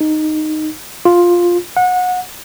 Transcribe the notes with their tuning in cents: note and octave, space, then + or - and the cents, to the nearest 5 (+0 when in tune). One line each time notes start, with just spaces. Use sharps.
D#4 -10
F4 +5
F#5 -25